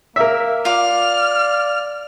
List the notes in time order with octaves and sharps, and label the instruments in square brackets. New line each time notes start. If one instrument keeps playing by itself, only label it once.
[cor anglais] A#3 [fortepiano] A#4 E5
[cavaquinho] F4 D6 [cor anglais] D5 [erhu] F6